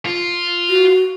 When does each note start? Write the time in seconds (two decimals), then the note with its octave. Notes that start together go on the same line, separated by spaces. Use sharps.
0.05 F4
0.70 F#4